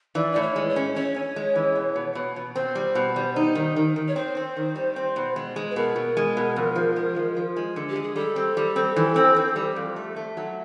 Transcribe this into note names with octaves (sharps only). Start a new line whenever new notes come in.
E3 D5
A2 D5
C#5
G#3
C#5
C#4
C#4 C#5
C#4
G#3
E3
B2
B2
B2
B2
C4 C5
G3
B2
G3
D#4
D#3
D#3
D#3
C#5
C4 C5
C4
D#3
G3
C4
B2
G#3
G#3
B4
B2 A#4
B2
G#3
B2
F2
F3
G#3
F3
F3
G#3
D3
G4
G#3
G#4
G3 A4
C4
G3
C4
E3
C4
C4
G3
F2
A3
A3
F#3